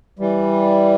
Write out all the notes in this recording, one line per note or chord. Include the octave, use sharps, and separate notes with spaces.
E3 G3